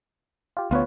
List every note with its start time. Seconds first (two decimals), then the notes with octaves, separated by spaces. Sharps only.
0.57 F4 G4
0.71 D2 B3 F4 B4 C#5